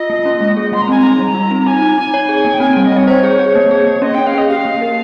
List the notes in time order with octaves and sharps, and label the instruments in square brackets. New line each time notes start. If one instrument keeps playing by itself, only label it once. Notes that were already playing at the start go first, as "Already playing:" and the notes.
Already playing: [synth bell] F4 [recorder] D#5
[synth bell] A#3
C#4
G#3
G#4
[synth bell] G3 [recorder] C6
[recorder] A#5
[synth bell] C4 [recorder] G#5
[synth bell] D#4 [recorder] A#5
[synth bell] G3
F4
C4
[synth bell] D#4 [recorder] G#5
[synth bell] D#4
D#4
C#5
G#4
A#3
[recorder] G5
[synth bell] C4 [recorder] G#5
[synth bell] G3 [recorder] G5
[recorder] D#5
[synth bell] C4 [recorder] C#5
[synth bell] C5 [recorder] C#5
[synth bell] G#4
G#4
A#3
G#4
A#3
[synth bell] C#4 [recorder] D#5
[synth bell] C#4 [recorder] G5
[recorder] F5
[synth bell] G#4 [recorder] D#5
[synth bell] G4 [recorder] F5
[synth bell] A#3
A#4